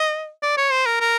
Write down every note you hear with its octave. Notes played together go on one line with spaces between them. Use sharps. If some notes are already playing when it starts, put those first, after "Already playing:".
Already playing: D#5
D5
C#5
C5
A#4
A#4